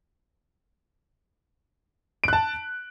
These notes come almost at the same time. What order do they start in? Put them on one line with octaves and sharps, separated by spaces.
D7 F#6 A5